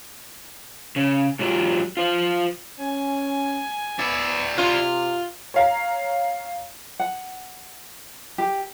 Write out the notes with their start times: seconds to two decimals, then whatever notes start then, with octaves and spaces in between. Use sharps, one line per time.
0.96 C#3
1.39 G#2 F#3 C4 F4 G4
1.97 F4 C5
2.79 C#4 G#5
3.99 B3 E4 D5
4.58 C3 F4
5.54 C#5 F5 A#5
6.99 F#5
8.38 G4